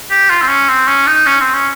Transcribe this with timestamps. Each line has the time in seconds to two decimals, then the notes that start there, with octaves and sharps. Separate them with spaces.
0.10 G4
0.30 F4
0.42 C4
0.48 C#4
0.69 C4
0.88 C#4
1.07 D#4
1.26 C#4
1.41 C4
1.54 C#4